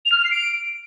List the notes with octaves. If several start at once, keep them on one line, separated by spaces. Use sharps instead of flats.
F7
F6
F7
C7
D7